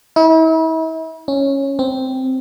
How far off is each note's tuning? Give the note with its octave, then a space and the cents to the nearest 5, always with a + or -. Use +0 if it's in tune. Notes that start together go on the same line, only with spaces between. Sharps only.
E4 -40
C#4 -10
C4 -5